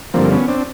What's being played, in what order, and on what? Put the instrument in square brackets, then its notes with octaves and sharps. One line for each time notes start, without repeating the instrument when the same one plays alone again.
[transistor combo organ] G2 D3 F3 A#3 C4
B3 C#4
C4 D4